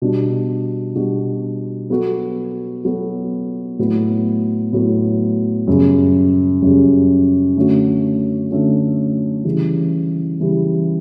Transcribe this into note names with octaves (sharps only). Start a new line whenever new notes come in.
B2 G3 D4 F#4
B2 G3 D4 F#4
F#3 B3 F#4 A4
F#3 B3 F#4 A4
A2 F#3 B3
A2 F#3 B3
F#2 C#3 G3
F#2 C#3 G3
D3 A3 C#4 F#4
D3 A3 C#4 F#4
C#3 E3 G3
C#3 E3 G3